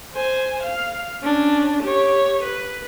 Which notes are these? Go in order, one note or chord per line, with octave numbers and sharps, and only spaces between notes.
C5 G#5
F5
C#4 D4
G4 C#5
B4